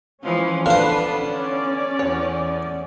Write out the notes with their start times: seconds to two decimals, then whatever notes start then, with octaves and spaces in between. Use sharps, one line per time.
0.24 E3 F3 G#3 C#4
0.66 D3 B3 D4 B4 C5 F5
1.19 C#4 D5
1.99 E2 C#5